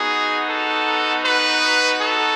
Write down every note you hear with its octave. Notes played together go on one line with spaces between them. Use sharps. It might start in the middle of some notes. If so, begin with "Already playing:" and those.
Already playing: B3 D#4 F#4 G#4
A4
B4
A4